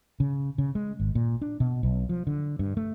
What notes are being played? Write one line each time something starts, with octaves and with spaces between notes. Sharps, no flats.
C#3
C#3
G#3
G#1
A#2
D4
B2
B1
F3
D3
G2
A3